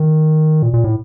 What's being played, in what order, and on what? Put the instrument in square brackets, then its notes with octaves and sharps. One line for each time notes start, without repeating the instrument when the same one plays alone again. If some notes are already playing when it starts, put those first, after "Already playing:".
Already playing: [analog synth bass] D#3
A#2
A#2
A2